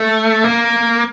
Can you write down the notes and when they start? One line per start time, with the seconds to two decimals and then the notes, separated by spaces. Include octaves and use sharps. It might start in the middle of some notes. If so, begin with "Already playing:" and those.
Already playing: A3
0.44 A#3